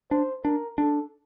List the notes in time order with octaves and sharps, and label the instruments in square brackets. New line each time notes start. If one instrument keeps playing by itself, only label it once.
[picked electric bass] D4 [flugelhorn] C5
[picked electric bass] D4 [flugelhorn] A#4
[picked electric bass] D4 [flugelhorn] A4